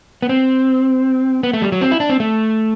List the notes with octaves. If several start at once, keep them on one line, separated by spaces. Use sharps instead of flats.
B3
C4
B3
A3
G3
F#3
C4
E4
D4
C4
A3